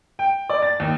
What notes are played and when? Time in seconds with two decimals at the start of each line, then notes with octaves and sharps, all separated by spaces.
0.19 G5
0.50 D5
0.63 A6
0.80 D#2